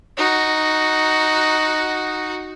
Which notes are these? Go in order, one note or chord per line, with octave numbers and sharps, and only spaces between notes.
D#4 F#4